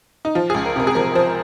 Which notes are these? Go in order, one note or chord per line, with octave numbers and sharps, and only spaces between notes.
D#4
F3 F4
C#2 G#4
A#4
C3 A#4
G#4
F3 A#4
F3 C5